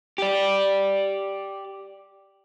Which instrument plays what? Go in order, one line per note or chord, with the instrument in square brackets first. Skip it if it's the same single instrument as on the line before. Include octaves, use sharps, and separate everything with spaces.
[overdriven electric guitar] G4 D5